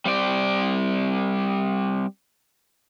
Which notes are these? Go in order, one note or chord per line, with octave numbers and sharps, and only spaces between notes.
G3 C4 D5